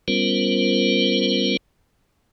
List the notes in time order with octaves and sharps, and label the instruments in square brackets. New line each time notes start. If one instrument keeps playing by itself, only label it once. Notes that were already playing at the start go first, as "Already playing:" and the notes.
[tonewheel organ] G3 B3 C#4 F4 A#4 C5